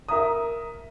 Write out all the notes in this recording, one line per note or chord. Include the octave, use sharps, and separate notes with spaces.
A#4 E5 A#5 D#6